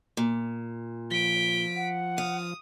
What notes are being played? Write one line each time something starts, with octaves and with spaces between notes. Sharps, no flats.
A#2
F3 B6 D7 G7
F#5
F5 D#6